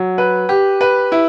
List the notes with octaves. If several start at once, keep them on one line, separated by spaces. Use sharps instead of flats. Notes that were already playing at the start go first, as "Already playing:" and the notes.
Already playing: F#3
B4
G4
B4
E4